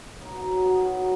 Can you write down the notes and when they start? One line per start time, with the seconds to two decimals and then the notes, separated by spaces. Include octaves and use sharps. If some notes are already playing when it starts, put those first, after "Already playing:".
0.20 F#3 B3 D#4
0.35 F#3 D#4 F#4
0.51 F#3
0.65 F#3 G#4 B4
0.76 F#3 F#4 G#4 A#4
0.95 F#3